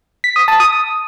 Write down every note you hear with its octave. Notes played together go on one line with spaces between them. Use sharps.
B6
D#6
A5
D#6